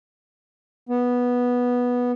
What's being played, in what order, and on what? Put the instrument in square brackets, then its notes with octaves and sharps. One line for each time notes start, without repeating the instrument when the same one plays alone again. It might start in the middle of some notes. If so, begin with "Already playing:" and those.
[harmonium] B3